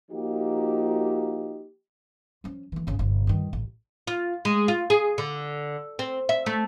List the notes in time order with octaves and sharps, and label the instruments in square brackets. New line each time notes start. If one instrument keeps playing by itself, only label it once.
[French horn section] F3 A#3 D#4 F#4 G4
[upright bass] F3 C#4
E3 A3
G#1 C#3
G1 C3
G2 D#3
A1
[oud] F4
G#3
F4
G#4
D3
C4
E5
A3